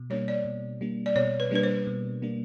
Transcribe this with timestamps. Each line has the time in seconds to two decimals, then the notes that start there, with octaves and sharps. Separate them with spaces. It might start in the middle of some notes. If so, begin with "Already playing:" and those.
Already playing: B2
0.10 G3 A#3 D4 C#5
0.28 D5
0.45 B2
0.81 G3 A#3 D4
1.06 D5
1.16 B2 C#5
1.40 B4
1.51 G3 A#3 D4 B4
1.63 C5
1.87 B2
2.22 G3 A#3 D4